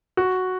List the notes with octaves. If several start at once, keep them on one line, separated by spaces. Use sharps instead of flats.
F#4